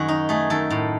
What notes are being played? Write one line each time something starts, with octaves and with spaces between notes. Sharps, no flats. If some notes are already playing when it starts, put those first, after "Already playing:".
Already playing: F#2 D#3 F#4 G#4
D#4
A3 G#4
D#3 A4
A2